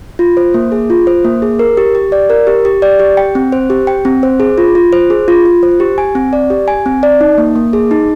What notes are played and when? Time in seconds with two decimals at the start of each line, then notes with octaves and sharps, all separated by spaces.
0.19 F4
0.37 C5
0.54 A#3
0.72 G#4
0.90 F4
1.07 C5
1.25 A#3
1.42 G#4
1.59 A#4
1.77 G4
1.95 G4
2.12 D5
2.30 A#4
2.47 G4
2.65 G4
2.82 D5
2.99 G4
3.17 G5
3.35 C4
3.52 C5
3.70 G4
3.87 G5
4.05 C4
4.23 C5
4.40 G#4
4.58 F4
4.75 F4
4.93 C5
5.10 G#4
5.28 F4
5.45 F4
5.63 C5
5.80 G4
5.98 G#5
6.15 C4
6.33 D5
6.50 G4
6.68 G#5
6.86 C4
7.03 D5
7.21 D#4
7.38 A#3
7.55 A#3
7.73 G#4
7.91 D#4